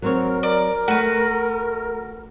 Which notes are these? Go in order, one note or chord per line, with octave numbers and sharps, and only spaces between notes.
F#3 C4 A#4 C#5
A#4 D5
A3 F#4 B4